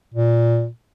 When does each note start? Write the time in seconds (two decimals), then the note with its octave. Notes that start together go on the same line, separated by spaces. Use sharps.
0.14 A#2